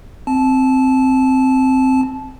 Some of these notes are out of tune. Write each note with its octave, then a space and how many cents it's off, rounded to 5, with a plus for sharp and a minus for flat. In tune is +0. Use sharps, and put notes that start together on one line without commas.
C4 +0 A5 -20